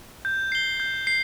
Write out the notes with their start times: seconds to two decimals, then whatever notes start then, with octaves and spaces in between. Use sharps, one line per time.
0.25 G6
0.52 C7 G7
0.80 G6
1.07 C7